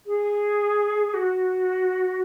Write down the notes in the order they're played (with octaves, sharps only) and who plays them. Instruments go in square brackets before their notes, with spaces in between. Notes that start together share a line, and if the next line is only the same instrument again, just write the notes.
[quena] G#4
F#4